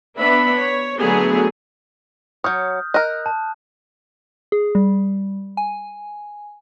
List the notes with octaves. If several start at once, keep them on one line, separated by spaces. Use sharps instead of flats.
B3 D4 E5 B5
C#5
D3 F#3 A3 B3 G#4
F#3 C#5 D#6 F6 G6
A#4 D#5 F#6
A5
G#4
G3
G#5